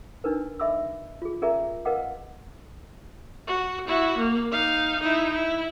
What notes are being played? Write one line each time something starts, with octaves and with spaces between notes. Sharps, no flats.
D4 D#4 A#4 B4
D#5 E5 B5 D6 E6
F4 G#4
C#4 G#4 A#4 D5 E5 A#5
A#4 B4 D#5 F5 F#5 D6
F#4
E4 F#4
A#3
D#4 F5
D#4 E4
E4